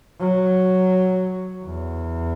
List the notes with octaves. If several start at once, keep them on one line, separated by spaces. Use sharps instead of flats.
F#3
E2